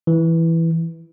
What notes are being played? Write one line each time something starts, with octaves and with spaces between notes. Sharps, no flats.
E3